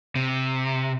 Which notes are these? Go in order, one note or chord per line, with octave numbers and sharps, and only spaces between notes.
C3